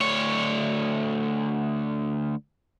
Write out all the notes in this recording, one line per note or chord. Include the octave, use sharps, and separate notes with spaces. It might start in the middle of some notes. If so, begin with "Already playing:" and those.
D2 C#5